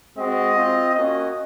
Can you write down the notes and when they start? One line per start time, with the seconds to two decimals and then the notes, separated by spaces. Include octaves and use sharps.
0.17 G#3 C4 F#4 D#5
0.55 C4 F4
0.94 A#3 C#4 F#4 D#5